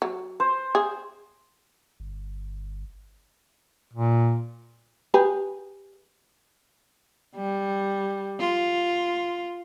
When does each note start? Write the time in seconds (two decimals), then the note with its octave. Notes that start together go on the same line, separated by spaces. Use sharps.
0.02 F#3
0.40 C5
0.75 G#4
2.00 G1
3.94 A#2
5.14 G4 G#4 B4
7.35 G3
8.40 F4